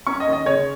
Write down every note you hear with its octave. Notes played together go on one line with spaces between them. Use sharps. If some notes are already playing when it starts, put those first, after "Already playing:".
C#4 C#6
D#5
D#2
D#5
C#3 C#5